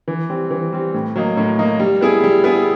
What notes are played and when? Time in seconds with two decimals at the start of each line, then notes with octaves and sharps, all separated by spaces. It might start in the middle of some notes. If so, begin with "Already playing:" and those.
0.08 E3
0.29 G3 C4
0.51 E3
0.72 G3 C4
0.94 A2
1.16 F#3 A#3 D#4
1.37 A2
1.58 F#3 A#3 D#4
1.80 G3
2.01 B3 E4 G#4
2.24 G3
2.44 B3 E4 G#4